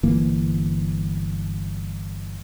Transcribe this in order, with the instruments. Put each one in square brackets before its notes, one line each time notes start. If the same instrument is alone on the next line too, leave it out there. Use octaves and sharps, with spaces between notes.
[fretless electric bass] G1 E3 A#3